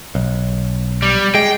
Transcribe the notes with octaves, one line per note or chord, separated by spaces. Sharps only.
B1
G3
G#3 G5